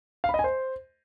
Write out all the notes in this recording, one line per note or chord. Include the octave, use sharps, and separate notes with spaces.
F5
B5
D#5
G#5
C5